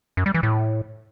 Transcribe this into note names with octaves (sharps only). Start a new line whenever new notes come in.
F#2
G3
E3
A2